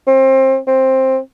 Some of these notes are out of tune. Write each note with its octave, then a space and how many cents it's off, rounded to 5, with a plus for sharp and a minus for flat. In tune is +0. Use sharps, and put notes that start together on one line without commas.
C4 +25
C4 +10